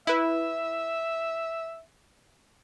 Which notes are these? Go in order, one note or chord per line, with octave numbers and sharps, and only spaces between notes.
E4 B4 E5